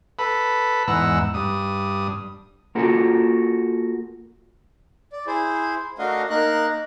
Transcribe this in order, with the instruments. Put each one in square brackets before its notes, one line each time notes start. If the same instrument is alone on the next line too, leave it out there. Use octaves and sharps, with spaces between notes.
[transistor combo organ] A4 B4 B5
E2 G#2 F#5 A#5 E6
G2 D#6
[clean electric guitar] A#3 F4 F#4 A4 A#4
[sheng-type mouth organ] D5
E4 G#4 C5
A3 D4 F#4 A#4 D#5 F5
A#3 D#4 A#4 F#6